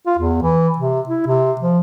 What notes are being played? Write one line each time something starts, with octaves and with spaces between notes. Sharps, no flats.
F4
E2
E3
C3
E4
C3
F3